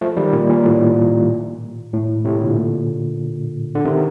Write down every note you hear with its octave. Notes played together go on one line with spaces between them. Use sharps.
F3 A3
D#3 G3
A#2
A#2
A2
A2
A2 C3
A#2 D3
D3
C3 D#3